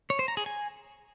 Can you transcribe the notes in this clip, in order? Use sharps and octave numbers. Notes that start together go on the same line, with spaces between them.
C#5
C5
A#5
G#4
G#5